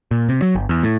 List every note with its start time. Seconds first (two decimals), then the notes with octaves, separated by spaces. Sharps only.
0.11 A#2
0.29 C3
0.42 F#3
0.55 G1
0.69 E2
0.83 A2